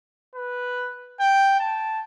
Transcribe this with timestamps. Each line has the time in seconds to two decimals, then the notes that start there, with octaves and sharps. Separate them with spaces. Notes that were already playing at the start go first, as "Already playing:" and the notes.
0.35 B4
1.20 G5
1.60 A5